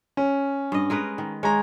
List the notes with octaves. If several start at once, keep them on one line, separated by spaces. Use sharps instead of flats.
C#4
G2 D#5
G#3 A#4 B4
D#3
G#3 C#5 A#5